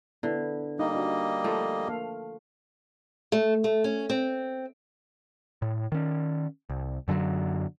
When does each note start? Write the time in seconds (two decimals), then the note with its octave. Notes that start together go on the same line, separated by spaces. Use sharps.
0.23 D3 B3 E4
0.79 G3 A#3 D#4 D#5
0.95 D4 F#4
1.44 F3 A3
1.88 A#3 A4 F5
3.32 A3
3.64 A3
3.84 C#4
4.10 C4
5.62 A2
5.92 D#3 C#4
6.70 C2
7.08 F#2 D3 E3 F#3